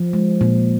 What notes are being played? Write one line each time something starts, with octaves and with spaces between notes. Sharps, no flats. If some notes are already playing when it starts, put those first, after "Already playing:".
Already playing: F3
G#3
A#2